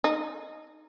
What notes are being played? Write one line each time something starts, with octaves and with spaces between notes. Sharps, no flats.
D#4